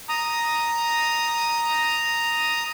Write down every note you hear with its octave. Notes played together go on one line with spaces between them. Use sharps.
A#5 D#6